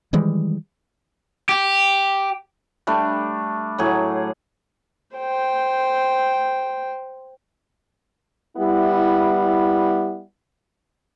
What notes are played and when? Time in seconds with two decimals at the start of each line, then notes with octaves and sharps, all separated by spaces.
0.13 D#3 E3 G3 G#3
1.49 G4
2.87 G3 A3 D4
3.78 A2 F#3 G#4
5.17 C5 G5
8.57 G3 B3 E4